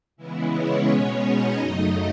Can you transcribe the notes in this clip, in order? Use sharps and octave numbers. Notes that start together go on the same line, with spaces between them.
C#3 E3 G#3 B3 E4
C#4 C#5
B2 G#3 B3
D#4 D#5
F#2 C#3 F#3 A3